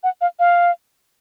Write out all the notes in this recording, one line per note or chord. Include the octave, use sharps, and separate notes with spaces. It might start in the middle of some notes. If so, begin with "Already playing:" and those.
F#5
F5
F5